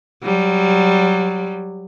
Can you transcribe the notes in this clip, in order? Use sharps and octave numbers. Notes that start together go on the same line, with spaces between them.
F#3 G3